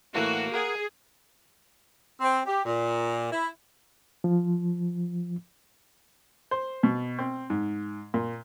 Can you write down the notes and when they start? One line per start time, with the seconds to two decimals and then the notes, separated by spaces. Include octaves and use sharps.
0.15 A2 E3 A#3 F#4
0.54 G#4 A#4 F#5
2.21 C4
2.46 G4
2.65 A#2
3.32 E4
4.24 F3
6.51 C5
6.83 B2
7.19 C4
7.50 G#2
8.14 A#2